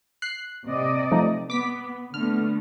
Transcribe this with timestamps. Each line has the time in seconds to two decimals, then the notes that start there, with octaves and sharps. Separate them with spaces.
0.22 F#6 C7
0.68 C3 D5 D#5
1.12 F3 A3 D#4
1.50 B3 D6 B6
2.14 D3 A3 B3 F6